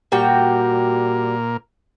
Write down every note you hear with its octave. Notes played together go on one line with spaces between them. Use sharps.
A#2 G3 F#4 A#4 G5